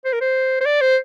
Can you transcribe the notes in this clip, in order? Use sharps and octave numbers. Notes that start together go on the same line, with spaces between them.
C5
A#4
C5
C5
D5
C5